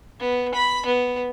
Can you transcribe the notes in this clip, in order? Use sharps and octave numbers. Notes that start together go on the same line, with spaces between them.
B3
B5
B3